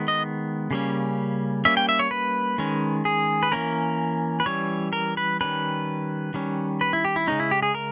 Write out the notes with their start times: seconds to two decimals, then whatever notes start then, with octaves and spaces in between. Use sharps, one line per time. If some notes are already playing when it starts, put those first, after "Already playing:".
Already playing: D#3 G#3 B3
0.08 D#5
0.71 C#3 G3 A#3 C#4
1.65 G3 A#3 C#4 E5
1.77 G5
1.89 E5
1.99 C#5
2.11 B4
2.58 D#3 G#3 C#4
3.05 G#4
3.43 B4
3.52 E3 A#3 C#4 A#4
4.40 B4
4.46 E3 G3 C#4 C#5
4.93 A#4
5.17 B4
5.41 D#3 G3 C#4 B4
6.34 D#3 G3 C#4
6.81 B4
6.93 E4
7.05 G4
7.16 E4
7.27 C#3 G#3 C#4 D#4
7.40 E4
7.51 G4
7.63 G#4
7.75 A#4